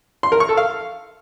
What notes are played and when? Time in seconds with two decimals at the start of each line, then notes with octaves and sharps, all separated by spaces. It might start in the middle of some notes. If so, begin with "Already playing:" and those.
0.23 C6
0.32 A#4
0.40 C#6
0.49 A4
0.57 F5